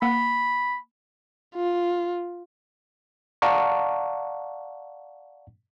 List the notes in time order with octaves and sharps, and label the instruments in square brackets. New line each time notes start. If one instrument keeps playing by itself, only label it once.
[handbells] A#3 F#5 [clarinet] B5
[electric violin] F4
[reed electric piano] D5 F5 F#5 A5 A#5 C#6